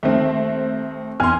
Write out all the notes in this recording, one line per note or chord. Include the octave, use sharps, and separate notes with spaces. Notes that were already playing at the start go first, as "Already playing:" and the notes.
D#2 A3 C4
E2 G#5 C6 F6